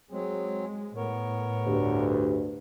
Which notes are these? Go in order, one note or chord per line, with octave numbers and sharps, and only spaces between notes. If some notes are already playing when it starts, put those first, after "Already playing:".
F#3 G#3 C4
A2 B3 A#4 C#5
D2 G2